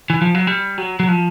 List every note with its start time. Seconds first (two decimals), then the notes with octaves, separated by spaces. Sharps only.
0.10 E3
0.22 F3
0.35 F#3
0.47 G3
0.78 F#3
1.00 F#3
1.08 F3